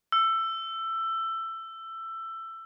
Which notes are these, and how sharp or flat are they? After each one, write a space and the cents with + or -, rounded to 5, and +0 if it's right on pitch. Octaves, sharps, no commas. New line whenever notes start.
E6 +20